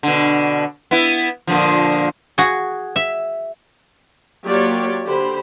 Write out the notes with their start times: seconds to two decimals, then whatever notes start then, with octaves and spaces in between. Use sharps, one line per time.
0.03 B2 D3
0.91 B3 E4
1.47 A#2 D3 F3
2.38 F#4 G#4
2.96 E5
4.44 F#3 A#3 F4 G4 C#5 D5
5.06 D3 G4 C5 B5